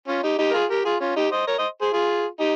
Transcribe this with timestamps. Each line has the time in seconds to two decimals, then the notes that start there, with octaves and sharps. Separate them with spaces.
0.08 C#4 F4
0.23 D#4 G4
0.39 D#4 G4
0.51 A#4
0.54 F4 G#4
0.70 G4 A#4
0.85 F4 G#4
1.00 C#4 F4
1.16 D#4 G4
1.32 C5 D#5
1.47 A#4 C#5
1.58 C5 D#5
1.81 G#4 C5
1.93 F4 G#4
2.40 D#4 G4